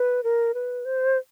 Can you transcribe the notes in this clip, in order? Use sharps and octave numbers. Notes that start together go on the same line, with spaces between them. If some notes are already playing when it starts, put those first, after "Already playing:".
Already playing: B4
A#4
B4
C5